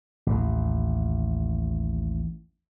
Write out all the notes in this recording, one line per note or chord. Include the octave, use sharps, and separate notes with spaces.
A1 D#2